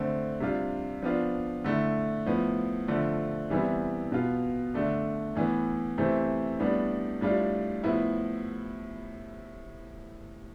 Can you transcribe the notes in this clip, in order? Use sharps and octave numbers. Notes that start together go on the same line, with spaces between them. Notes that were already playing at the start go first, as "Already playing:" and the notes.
Already playing: D3 A3 C4
C3 G3 D4 F4
F3 B3 D4 F4
D3 A3 E4
A2 F3 B3
D3 F3 A3
C3 E3 G3 B3 E4
B2 B3 F4
D3 A3 D4
A2 E3 B3
C3 E3 A3 C4
A2 G3 B3 D4
A2 G3 D4 F4
A2 F3 B3 E4